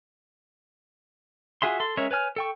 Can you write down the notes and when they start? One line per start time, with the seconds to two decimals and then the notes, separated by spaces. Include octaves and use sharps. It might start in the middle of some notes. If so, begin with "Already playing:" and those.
1.62 F4 F#4 G#4 E5 C6
1.80 A4 C6
1.97 G#3 C#4 A#4 C#5 E5
2.11 B4 C#5 G#5 F6
2.36 A4 G5 C#6